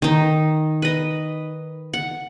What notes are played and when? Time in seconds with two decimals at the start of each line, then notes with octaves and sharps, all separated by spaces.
0.02 D#3 D#4
0.82 B4 D#5
1.94 F#5